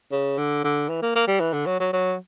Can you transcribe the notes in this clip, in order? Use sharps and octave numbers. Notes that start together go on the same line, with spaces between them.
C#3
D3
D3
E3
A#3
A#3
G3
E3
D3
F#3
F#3
F#3